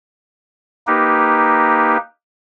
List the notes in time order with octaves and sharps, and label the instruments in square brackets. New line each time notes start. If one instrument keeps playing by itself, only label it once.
[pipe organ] A#3 D#4 G4 B4